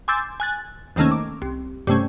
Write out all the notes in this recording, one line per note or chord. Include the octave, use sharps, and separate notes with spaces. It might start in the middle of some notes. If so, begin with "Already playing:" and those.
G#5 C6 D6 E6 G6 A6
G#5 F#6 A6
D#2 C3 D#3 A3 A#3 C#4
D6
C2
G2 C3 A3 C#4